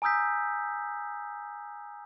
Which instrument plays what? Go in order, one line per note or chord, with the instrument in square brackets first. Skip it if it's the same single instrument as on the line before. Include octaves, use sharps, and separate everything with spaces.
[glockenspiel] G#5 A#5 D#6 E6 G6 B6